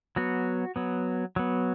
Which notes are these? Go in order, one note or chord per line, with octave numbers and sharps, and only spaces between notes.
F#3 B3 F#4
F#3 B3
F#3 B3